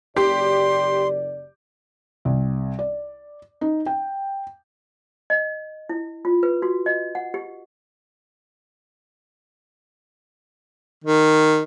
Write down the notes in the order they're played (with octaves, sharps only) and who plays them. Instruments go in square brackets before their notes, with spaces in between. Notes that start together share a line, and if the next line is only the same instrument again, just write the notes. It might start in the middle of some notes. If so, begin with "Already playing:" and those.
[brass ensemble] F#1 D5 [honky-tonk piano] G4 [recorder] C6
[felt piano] C2
D5
D#4
G5
[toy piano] D#5
E4
F4
B4
F#4
D#5
F#5
G4
[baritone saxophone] D#3